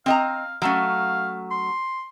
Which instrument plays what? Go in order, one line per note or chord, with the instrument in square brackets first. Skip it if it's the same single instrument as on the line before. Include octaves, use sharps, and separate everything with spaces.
[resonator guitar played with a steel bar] C4 D#5 A#5 [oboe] F5
[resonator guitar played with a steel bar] F#3 A3 C#4 [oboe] F5
[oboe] C6